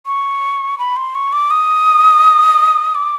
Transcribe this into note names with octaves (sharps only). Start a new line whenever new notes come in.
C#6
B5
C6
C#6
D6
D#6
D6